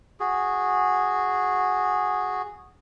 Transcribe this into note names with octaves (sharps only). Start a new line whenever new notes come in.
F#4 G#4